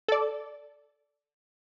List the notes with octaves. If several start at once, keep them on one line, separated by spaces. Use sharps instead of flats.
A4 D5